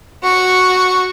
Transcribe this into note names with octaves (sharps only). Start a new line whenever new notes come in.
F#4 C#6